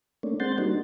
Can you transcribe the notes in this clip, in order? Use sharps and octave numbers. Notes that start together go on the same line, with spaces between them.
A3 A#3 C#4 D4
G#3 C4 F#5 C6 G6 A6
G3 A#3 D4 D#4 F#4